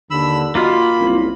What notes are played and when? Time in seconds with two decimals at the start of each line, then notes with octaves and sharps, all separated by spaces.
0.11 D#2 D3 B5 E6
0.55 A#3 D#4 F4 F#4 B5 F6
0.99 F#1 C2